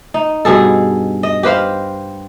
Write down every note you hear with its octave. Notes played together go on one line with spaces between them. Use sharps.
D#4
G2 B2 G#4 A4
D#5
G4 B4 C5 F5